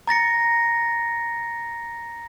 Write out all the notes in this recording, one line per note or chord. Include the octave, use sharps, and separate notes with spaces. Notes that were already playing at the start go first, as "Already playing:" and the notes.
A#5 A6 A#6 C#7